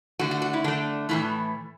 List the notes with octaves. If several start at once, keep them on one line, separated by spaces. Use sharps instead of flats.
D3 A3 F#4
F#4
F#4
E4
D3 A3 D4
A2 E3 A3 E4